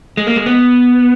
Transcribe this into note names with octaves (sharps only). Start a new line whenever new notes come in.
G#3
A#3
G#3
B3